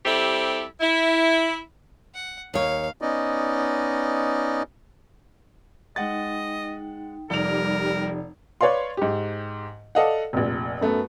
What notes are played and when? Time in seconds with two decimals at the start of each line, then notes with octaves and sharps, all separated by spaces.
0.05 G3 C4 E4 G4 A4
0.81 E4
2.14 F#5
2.54 D#2 C#5 F5
3.01 B3 C#4 D#4 D5 D#5
5.96 G#3 D#4 D#5 F#5 G5 A6
7.30 F1 G3 D#4 A#4 D5 F7
8.61 B4 C#5 D5 F5 C6
8.97 G#2 G4
9.95 A4 D5 D#5 F5 F#5
10.33 F1 A#1
10.81 F#2 A3 B3